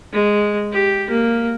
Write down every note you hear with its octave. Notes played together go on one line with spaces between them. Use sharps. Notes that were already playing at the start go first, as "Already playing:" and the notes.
G#3
G4
A#3